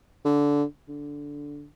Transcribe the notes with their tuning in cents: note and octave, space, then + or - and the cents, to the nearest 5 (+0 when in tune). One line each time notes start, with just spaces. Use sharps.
D3 -15
D3 -10